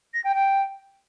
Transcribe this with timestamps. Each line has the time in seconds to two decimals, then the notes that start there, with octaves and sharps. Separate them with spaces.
0.14 A#6
0.24 G5
0.35 G5